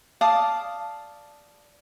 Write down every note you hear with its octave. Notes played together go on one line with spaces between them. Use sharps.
D5 F5 A5 D#6